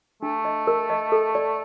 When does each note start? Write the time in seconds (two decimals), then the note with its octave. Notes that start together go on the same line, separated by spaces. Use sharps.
0.23 A3 D4
0.45 D#5
0.67 A#4
0.90 D#5
1.12 A4
1.35 D5